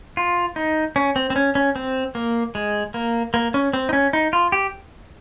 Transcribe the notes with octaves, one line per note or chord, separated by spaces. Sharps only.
F4
D#4
C#4
C4
C4
C#4
C#4
C4
A#3
G#3
A#3
A#3
C#4
C4
D#4
C#4
D#4
F4
G4